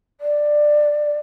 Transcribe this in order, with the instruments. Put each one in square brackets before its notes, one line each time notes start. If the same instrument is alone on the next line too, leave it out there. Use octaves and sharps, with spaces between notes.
[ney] D5